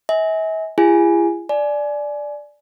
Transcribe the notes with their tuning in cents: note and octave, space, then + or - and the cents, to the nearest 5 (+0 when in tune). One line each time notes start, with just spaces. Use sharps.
E5 -45 G#5 +0
E4 +45 G#4 -35 G#5 +0
D5 +0 G#5 +25